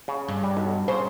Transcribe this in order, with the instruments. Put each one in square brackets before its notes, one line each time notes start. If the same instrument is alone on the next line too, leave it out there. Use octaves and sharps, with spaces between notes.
[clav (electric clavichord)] C#3
[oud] G2
[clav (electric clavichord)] G3
B1
[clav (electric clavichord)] C#3 [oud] C5